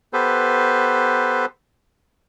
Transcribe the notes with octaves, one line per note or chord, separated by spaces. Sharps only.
B3 G4 A4 B4 C5